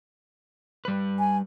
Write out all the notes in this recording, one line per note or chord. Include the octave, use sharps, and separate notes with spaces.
G3 B4
G#5